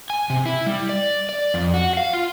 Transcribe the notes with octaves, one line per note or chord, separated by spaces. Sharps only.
G#5
C3
E4
G3
D5
D5
F2
F#4
F5
F4